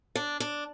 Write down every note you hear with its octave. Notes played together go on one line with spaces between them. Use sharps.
D4
D4